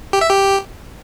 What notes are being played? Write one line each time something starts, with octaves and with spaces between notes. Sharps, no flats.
G4
E5
G4